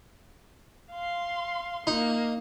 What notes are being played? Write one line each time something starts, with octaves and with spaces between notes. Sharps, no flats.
F5 C6
A#3 D#4